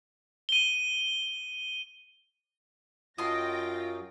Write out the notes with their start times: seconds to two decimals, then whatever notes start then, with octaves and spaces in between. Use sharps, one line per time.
0.49 D#7 G7
3.18 F#2 F#3 F4 D#5 G5 C6 A#6